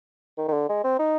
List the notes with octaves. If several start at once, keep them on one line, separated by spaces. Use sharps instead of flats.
D#3
D#3
D3
G#3
C4
D#4